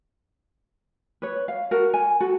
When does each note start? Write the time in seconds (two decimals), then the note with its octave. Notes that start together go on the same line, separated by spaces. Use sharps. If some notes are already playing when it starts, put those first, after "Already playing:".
1.22 B4 C#5
1.48 F5
1.71 F#4 A4 A#4
1.94 G#5
2.21 F#4 A4